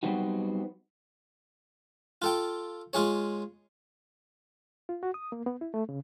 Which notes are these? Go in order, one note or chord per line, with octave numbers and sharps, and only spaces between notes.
F#3 G3 B3 C4 D#4 F#4
F4 A4 G5
G#3 F4 G#4 C#5
F4
F#4
D#6
A#3
B3
E4
A3
C#3